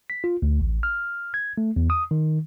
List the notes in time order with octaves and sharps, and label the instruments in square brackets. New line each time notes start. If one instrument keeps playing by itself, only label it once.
[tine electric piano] B6
F4
D2
A1
F6
G#6
A3
E2
D#6
D#3